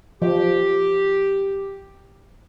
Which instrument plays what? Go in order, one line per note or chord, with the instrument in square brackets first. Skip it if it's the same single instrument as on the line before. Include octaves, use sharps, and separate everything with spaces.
[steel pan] F3 [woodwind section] G4